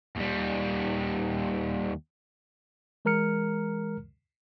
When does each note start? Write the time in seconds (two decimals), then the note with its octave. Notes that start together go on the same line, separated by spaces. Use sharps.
0.17 D#2 G3
3.05 E3 G#3 A#4 A#5 F6 C#7